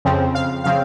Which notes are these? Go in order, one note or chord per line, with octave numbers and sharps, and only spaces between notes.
F2 C#3 F3 C4
F5
C#3 F3 C4 F5